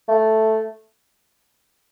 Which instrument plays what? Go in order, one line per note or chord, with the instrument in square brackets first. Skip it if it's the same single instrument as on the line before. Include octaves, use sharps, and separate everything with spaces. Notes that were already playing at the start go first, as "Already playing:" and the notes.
[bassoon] A3